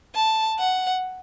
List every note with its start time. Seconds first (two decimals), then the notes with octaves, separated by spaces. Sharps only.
0.15 A5
0.59 F#5